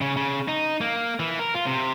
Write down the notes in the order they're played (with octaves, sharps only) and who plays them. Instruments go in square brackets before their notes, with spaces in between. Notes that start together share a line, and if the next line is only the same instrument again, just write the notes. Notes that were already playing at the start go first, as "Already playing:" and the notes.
[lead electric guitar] C#3
C#3
D#4
A#3
E3
A#4
F4
C3